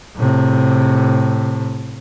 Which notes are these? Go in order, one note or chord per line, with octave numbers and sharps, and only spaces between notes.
A2 C3